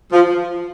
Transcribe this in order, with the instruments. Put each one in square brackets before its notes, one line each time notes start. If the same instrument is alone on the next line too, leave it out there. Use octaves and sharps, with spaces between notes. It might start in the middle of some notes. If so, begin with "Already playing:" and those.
[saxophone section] F3